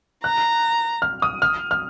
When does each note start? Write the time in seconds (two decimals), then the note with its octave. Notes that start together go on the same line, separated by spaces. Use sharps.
0.24 A#5 F#6
1.02 F6
1.22 D#6
1.42 F6
1.71 F6